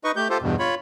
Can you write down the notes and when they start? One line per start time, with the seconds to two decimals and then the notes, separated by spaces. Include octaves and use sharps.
0.04 D#4 B4 D#5 C#6
0.16 A3 G4 G6
0.30 F4 G4 A4 C5
0.42 E2 G2 B2
0.59 F4 C#5 B5